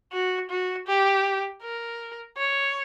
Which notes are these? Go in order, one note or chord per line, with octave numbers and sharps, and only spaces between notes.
F#4
F#4
G4
A#4
C#5